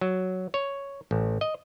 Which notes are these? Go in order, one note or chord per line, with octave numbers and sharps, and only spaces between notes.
F#3
C#5
A1
D#5